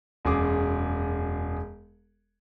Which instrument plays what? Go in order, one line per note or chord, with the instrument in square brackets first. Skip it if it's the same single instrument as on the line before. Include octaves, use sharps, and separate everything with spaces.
[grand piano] E1 F#2 G#4 D6